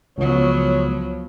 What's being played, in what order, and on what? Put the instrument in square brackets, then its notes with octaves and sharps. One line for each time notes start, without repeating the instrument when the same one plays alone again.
[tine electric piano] C#2 [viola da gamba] F3 F#3 B3 [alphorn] C#5